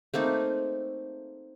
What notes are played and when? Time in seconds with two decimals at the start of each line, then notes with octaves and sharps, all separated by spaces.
0.14 A3 A#3 C4 D#4